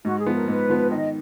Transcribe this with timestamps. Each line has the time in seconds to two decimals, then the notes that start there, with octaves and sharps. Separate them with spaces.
0.05 G#2 F#4
0.19 G#4
0.26 F3 B3
0.33 A#4
0.48 G#2 B4
0.69 F3 B3
0.91 D#3 D#5